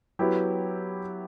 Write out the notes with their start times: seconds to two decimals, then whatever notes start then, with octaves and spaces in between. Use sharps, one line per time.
0.19 F#3 B3 E4 G4